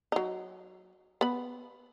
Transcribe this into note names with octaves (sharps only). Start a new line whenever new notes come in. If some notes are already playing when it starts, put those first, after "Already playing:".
F#3 D#4
B3 B5